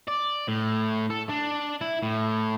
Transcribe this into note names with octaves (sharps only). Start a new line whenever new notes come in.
D5
A2
A4
D4
E4
A2